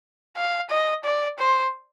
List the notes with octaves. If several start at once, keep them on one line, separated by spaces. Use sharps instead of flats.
F5
D#5
D5
C5